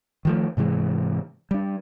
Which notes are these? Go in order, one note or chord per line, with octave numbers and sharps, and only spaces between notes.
D#3 F3 A3
G#2 C3 E3 G#3
G3 D4